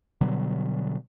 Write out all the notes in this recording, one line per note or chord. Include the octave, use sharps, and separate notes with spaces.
B2 D3 F#3 G3